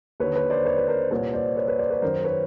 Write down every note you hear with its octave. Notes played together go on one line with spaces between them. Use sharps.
D#2 D3 B4 C#5
B4 C#5
C5 D5
B4 C#5
B4
A#4 C5
C2 A#2 B4 C#5
C5 D5
B4 C#5
B4 C#5
C5 D5
B4 C#5
F#2 D#3 A#4 C5
B4 C#5